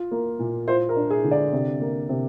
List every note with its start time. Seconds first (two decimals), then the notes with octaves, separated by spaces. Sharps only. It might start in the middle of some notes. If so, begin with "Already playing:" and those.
Already playing: F4
0.11 A#3
0.39 A#2
0.68 F4 C5
0.89 A#4
0.96 D4
1.10 G#4
1.24 D3
1.31 D5
1.53 C3
1.81 A#3
2.09 C3